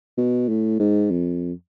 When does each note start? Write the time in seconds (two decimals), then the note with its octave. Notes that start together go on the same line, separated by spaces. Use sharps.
0.17 B2
0.49 A2
0.79 G#2
1.10 F2